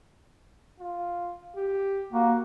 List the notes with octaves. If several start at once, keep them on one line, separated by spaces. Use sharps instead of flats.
F4
G4
A#3 F#4